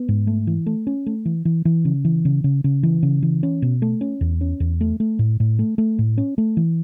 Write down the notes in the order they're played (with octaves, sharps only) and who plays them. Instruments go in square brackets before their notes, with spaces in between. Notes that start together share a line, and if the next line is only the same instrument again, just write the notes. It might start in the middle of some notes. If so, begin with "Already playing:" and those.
Already playing: [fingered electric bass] B3
G#2
A3
E3
A3
C#4
A3
E3
E3
E3
C#3
E3
C#3
C#3
C#3
E3
C#3
E3
C#4
B2
A3
C#4
E2
C#4
E2
A3
A3
A2
A2
A3
A3
A2
C#4
A3
E3